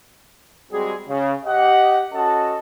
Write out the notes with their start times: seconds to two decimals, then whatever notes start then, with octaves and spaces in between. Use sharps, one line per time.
0.72 G3 G#3 C4 F#4 G#4
1.08 C#3
1.45 G4 D#5 F#5
2.13 C#4 F#4 A4 D#5 A5